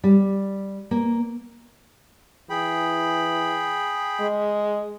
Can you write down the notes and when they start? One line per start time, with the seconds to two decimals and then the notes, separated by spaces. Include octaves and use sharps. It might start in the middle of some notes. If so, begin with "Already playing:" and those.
0.04 G3
0.91 A#3
2.50 E3 G#4 G5 B5
4.20 G#3